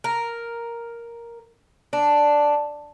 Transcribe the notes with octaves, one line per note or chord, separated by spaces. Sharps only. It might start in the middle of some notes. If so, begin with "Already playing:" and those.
A#4
D4